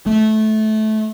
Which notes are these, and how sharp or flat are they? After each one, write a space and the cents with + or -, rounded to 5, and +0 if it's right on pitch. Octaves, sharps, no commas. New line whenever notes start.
A3 -20